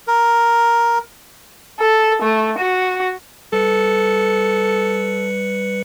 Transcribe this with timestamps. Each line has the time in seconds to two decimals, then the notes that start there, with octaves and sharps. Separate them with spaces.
0.07 A#4
1.79 A4
2.22 A3
2.58 F#4
3.53 G3 A4 B4 C#7